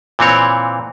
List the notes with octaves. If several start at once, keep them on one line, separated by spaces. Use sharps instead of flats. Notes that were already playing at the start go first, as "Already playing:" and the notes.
A#2 E3 C4 C#5